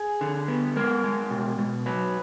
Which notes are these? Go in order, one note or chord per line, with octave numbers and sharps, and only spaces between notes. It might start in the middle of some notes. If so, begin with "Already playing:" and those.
Already playing: G#4
D3
B3
G#3 A#4
G#3
B2
B2
F#3 B4